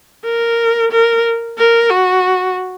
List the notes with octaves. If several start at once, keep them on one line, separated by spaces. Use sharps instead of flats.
A#4
A#4
A#4
F#4